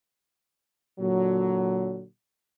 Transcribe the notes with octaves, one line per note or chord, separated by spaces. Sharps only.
A#2 D3 F#3